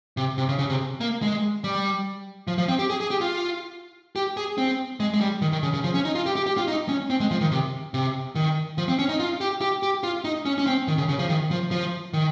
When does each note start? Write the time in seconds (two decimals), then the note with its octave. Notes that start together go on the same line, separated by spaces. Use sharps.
0.17 C3
0.38 C3
0.48 C#3
0.59 C#3
0.69 C3
1.01 A#3
1.22 G#3
1.64 G3
2.47 F3
2.58 F3
2.69 C4
2.79 G4
2.90 G#4
3.01 G#4
3.11 G4
3.21 F4
4.16 G4
4.37 G#4
4.58 C4
5.00 G#3
5.14 G#3
5.21 G3
5.42 D#3
5.52 D#3
5.63 C#3
5.73 C#3
5.84 F3
5.94 C#4
6.05 D#4
6.15 F4
6.26 G4
6.36 G4
6.46 G4
6.57 F4
6.68 D#4
6.89 C#4
7.10 C4
7.20 G#3
7.31 F3
7.41 D#3
7.51 C3
7.94 C3
8.35 D#3
8.78 F3
8.88 C4
8.99 C#4
9.09 D#4
9.20 F4
9.41 G4
9.61 G4
9.83 G4
10.03 F4
10.24 D#4
10.46 C#4
10.58 C#4
10.67 C4
10.88 D#3
10.98 C#3
11.09 C#3
11.19 F3
11.29 D#3
11.51 F3
11.71 F3
12.13 D#3